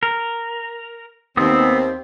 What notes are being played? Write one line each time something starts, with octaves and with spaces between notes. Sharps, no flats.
A#4
D#2 B3 C4 D#6 E6